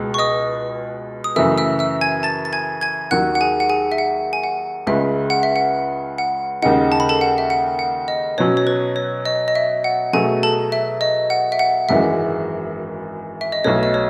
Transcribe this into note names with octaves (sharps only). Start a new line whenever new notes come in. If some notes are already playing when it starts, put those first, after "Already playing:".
Already playing: C#2 B2 G#3
C#6
D#5 D#6
D#6
F#2 C#3 E3 A3 E5 E6
E5 E6
E5 E6
G#5 G#6
A5 A6
A6
G#5 G#6
G#5 G#6
D#2 D#3 F#3 F#5 F#6
F#5
G#4 G#5
F#5
G#4 G#5
E5
F#5
G#5
F#5
C#2 C#3 G#3 C#4 E5
F#5
E5
F#5
F#5
D#2 C#3 G#3 D#4 F#5
A5
B5
A4 A5
F#5
E5
F#5
F#5
D#5
B2 F#3 C#4 C#5
C#5
B4
C#5
D#5
D#5
E5
F#5
B2 F#3 A3 G#4 G#5
A4 A5
E5
D#5
F#5
E5
F#5
G#1 F#2 E3 G#3 E5
E5
D#5
B1 B2 A3 C#5
D#5
C#5